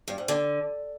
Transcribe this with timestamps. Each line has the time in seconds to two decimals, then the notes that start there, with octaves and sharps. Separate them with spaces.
0.08 G2
0.18 G#2
0.28 D3